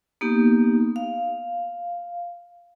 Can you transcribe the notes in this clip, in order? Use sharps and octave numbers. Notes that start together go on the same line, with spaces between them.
A#3 B3 D#4 G4
F5